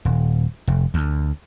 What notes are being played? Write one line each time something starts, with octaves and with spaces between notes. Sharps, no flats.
D#1
F1
D2